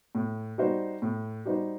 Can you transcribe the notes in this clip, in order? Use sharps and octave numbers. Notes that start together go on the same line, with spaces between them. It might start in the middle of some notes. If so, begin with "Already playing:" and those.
A2
G3 D#4 F#4 C5
A2
G3 D#4 F#4 C5